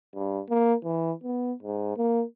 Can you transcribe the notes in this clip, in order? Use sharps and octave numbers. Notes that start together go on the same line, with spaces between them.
G2
A#3
E3
B3
G#2
A#3